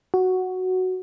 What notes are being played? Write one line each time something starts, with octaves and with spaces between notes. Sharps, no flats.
F#4